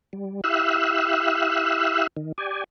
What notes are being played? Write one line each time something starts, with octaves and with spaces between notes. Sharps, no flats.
G3
E4 G4 E5 F5 E6 F#6
D#3
G4 D5 G#5